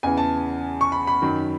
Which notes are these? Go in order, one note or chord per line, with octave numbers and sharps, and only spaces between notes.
E2 C#3 E3 G#5
A5
C#6
B5
B5
F#2 D#3 F#3